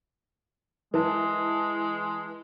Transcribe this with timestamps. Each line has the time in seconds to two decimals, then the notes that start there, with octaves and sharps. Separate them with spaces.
0.94 E3 G#3 A5